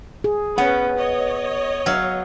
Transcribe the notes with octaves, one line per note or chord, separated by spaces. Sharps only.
G#4
B3 C#4 B4 F#5
C#5 D#5
F#3 E5 F5